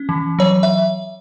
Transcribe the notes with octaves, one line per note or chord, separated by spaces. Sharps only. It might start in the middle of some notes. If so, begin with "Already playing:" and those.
Already playing: C#4
E3
F#3 C#5
E5